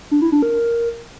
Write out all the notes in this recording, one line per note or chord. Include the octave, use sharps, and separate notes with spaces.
D4
E4
D4
A#4